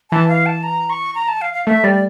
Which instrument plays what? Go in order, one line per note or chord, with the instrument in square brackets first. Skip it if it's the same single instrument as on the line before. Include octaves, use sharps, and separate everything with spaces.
[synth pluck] E3 [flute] A5
[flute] F5
A5
A#5
C#6
A#5
A5
F5
F5
[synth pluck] A3 [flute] E5
[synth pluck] G3 [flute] D5